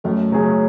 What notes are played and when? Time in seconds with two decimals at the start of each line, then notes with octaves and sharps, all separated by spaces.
0.04 F#2 A3
0.32 C#3 F#3 C#4 G#4